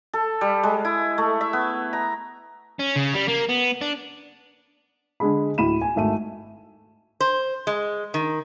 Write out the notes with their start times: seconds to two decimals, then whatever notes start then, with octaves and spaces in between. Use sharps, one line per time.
0.13 A4
0.41 G3
0.63 G#3
0.85 E4
1.18 A3
1.41 E5
1.53 B3
1.93 A#5
2.79 C#4
2.96 C#3
3.14 G3
3.28 A#3
3.49 B3
3.81 D4
5.20 D3 G#3 G#4 B5
5.58 D2 A2 B5 D#7 E7
5.82 G#5
5.96 G#1 A3 D#7
7.20 C5
7.67 G#3
8.14 D#3